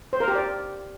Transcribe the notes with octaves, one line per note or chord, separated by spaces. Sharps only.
C5
A#4
G4
D5